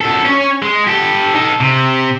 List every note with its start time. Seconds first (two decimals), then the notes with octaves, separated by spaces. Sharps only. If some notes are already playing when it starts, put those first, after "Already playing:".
0.01 F#2 A4
0.26 C#4 C#5
0.62 G#3
0.88 G4 A4
1.35 D#4 A4
1.61 C3